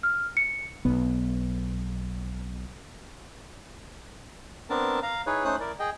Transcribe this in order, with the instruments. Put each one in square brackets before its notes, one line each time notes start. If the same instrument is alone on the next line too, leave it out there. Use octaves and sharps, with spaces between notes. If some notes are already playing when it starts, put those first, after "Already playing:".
[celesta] F6
C#7
[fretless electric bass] B1 B3
[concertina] B3 C4 D4 A#4 A5
F5 A#5
D#4 E4 G#4 B4 C#5
A3 C#4 D#4 C5 D#6 F#6
E4 A#4 D5
G#4 D#5 G5